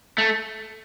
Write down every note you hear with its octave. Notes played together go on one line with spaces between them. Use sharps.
A3